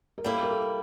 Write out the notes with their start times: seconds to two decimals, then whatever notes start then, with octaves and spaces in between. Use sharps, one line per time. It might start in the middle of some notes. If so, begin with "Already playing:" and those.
0.18 A#4
0.24 G3 A#3 E4 A4
0.43 A#4
0.51 A4